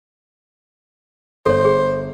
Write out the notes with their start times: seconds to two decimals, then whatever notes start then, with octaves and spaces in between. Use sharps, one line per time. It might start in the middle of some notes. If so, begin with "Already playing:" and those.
1.46 G1 A4 C5 C#5
1.65 G#4